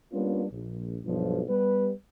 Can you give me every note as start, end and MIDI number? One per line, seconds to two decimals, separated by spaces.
0.13 0.45 55
0.13 0.45 58
0.13 0.45 59
0.13 0.45 61
0.13 0.45 62
0.13 0.45 65
0.51 0.98 34
1.04 1.41 35
1.04 1.41 43
1.04 1.41 53
1.48 1.90 55
1.48 1.90 59
1.48 1.90 71